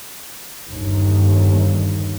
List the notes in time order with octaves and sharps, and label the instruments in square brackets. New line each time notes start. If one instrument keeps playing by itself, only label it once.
[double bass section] G1 D#2